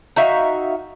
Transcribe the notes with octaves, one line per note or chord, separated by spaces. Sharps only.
D#4 F#4 E5 F5